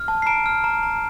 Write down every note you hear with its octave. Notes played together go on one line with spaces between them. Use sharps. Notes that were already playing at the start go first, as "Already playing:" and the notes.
Already playing: F6
A5
C7
A#5 D7
F6
A#5
A#5